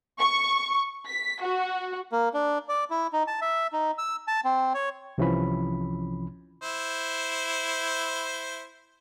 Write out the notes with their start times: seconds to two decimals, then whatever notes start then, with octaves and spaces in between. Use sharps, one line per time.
0.19 C#6
1.08 B6
1.41 F#4
2.11 A#3
2.34 D4
2.69 D5
2.91 E4
3.13 D#4
3.28 A5
3.41 E5
3.73 D#4
3.98 E6
4.28 A5
4.45 C4
4.74 C#5
5.18 C2 C3 E3 F3 C#4 B5
6.62 E4 C5